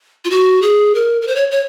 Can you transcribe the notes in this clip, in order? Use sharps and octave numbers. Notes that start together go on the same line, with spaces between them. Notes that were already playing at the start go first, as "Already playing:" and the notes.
F4
F#4
G#4
A#4
A#4
C5
C#5
C#5